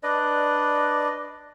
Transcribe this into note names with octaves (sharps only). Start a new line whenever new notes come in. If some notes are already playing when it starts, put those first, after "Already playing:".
D4 B4 D5 D#5